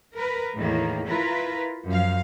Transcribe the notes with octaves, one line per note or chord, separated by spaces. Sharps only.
A#4 B4
E2 A2 D#3 A#3
E4 F4 A#4 B4
F#2 F3 F5